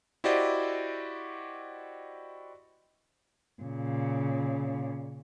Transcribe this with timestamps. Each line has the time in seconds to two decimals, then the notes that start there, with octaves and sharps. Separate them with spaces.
0.24 E4 F#4 G4 C5 D5 D#5
3.62 A#2 C#3